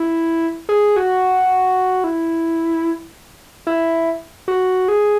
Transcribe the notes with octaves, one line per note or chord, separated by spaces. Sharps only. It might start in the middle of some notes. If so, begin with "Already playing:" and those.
Already playing: E4
G#4
F#4
E4
E4
F#4
G#4